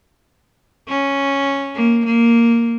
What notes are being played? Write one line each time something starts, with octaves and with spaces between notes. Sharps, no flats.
C#4
A#3
A#3